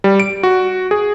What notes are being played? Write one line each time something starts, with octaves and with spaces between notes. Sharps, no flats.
G3
D7
F#4
G#4